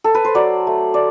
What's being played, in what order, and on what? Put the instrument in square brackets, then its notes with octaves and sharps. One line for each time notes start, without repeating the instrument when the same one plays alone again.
[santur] A4
B4
C5
F#3 D5
A3
D5